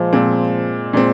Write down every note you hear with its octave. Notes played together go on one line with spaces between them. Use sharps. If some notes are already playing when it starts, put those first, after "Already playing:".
Already playing: A#2 F3 G#3
A#2 G#3 C4
A#2 G#3 C4